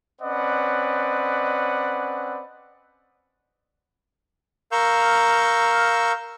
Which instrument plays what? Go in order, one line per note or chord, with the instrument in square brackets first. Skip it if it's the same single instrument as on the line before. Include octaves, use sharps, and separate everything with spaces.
[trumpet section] C4 C#4 B4 D5 D#5 F#5
[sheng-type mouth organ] A#4 F5 C#6 E6 F6 G6